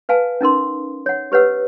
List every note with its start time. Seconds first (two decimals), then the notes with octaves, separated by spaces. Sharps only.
0.09 B4 F5 G#5 A5
0.41 C#4 D#4 A#4 C6
1.06 C#5 F#5
1.32 G4 B4 C#5 F#5 E6